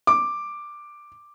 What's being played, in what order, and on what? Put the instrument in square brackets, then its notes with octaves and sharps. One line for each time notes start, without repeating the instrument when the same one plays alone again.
[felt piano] D6